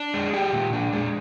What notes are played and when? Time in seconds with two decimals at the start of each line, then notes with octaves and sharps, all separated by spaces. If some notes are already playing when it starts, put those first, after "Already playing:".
Already playing: D4
0.14 G#3
0.33 G4
0.53 A#2
0.73 D4
0.93 G#3